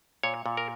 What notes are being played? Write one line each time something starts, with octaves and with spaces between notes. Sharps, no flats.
A#2 C#5
A#2
A#4